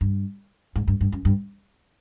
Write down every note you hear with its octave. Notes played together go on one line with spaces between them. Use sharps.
G2
G#2
G2
G2
F#2
G2